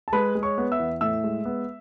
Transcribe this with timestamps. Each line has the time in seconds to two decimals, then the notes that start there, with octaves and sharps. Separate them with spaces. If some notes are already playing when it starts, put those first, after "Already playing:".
0.08 A5
0.13 G#3 B4 B5
0.35 G#3
0.43 C#5 C#6
0.58 B3
0.72 E5 E6
0.79 E2
1.01 A2 E5 E6
1.24 G#3
1.45 B3